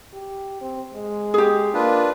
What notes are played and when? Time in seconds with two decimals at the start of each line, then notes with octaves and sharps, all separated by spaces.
0.14 G4
0.61 C4
0.94 G#3
1.34 G4 G#4
1.74 A#3 D4 F4 B4